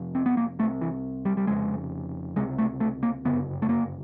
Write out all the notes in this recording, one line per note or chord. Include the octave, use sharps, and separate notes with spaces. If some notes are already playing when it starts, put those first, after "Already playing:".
Already playing: F1 F2 C3
C4
B3
A#3
C2 C3 A3
E3
G3
G3
F1 F2 C#3 G#3
C#2 C3 G#3
A3
A3
A#3
G1 F#2 C#3 B3
A3
A#3